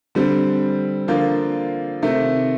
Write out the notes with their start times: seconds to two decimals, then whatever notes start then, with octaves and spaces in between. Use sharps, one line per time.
0.15 D3 G3 C4
1.08 D3 F3 A#3 F4
2.02 C3 D#3 A3